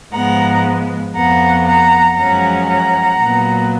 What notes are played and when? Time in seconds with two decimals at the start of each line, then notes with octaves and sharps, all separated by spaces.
0.13 G#2 F3 G#3 B3 F#5 A#5
1.16 F2 F3 B3 F#5 A#5
1.66 F#5 A#5
2.17 F#2 F3 G#3 C#4 F#5 A#5
2.68 F#5 A#5
3.19 A#2 F#3 B3